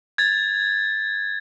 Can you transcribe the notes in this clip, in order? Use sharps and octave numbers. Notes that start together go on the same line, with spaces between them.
G#6 A6